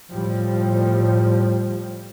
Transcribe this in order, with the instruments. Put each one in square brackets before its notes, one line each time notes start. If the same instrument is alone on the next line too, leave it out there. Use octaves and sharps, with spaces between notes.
[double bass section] A2 F3 G3